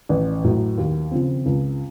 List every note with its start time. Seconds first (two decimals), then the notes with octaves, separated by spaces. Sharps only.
0.09 A1
0.44 A2 F#3
0.78 D#2
1.11 C#3 F3 C4
1.46 C#2